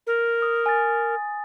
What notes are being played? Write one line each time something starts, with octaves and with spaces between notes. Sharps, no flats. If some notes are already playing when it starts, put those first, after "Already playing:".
A#4
D#6
G#5 A6